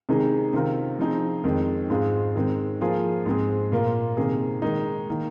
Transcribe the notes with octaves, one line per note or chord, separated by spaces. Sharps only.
C3 D#3 G#3 D#4 G#4
C3 D#3 C4 F4 A#4
F3 C4 D#4 G#4
F2 D#3 G#3
G#2 G#3 C4 F4 G#4
D#3 G#3 C4
F3 A#3 F4 G#4
G#2 G#3 C4 G#4
A#2 A#3 F4
C3 D#3 A#3 G#4
D#3 G#3 D#4
D#3 A#3